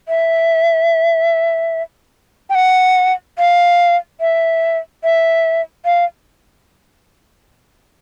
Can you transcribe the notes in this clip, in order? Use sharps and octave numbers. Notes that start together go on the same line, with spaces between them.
E5
G5
F#5
F5
E5
E5
F5